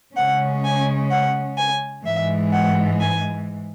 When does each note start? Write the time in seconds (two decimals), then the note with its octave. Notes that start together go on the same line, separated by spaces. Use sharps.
0.16 C#3 G#3 C#4 F#5
0.64 G#5
1.11 F#5
1.58 G#5
2.05 G#2 E3 G#3 E5
2.53 F#5
3.00 G#5